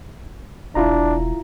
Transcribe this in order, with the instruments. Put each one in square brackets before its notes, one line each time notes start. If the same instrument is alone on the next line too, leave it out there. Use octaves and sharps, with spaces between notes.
[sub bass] E1 [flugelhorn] D4 [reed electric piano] E4 F4 A#5